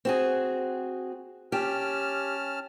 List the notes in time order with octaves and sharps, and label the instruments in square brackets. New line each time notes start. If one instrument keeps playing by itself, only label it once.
[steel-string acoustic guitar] C4 F#4 G#4
[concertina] C#4 A5 F6 [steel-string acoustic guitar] G4